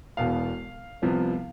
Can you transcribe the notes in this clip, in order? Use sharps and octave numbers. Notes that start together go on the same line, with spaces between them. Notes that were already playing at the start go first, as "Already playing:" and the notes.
E1 E2 B2 B3 F5
C2 C3 F3 B3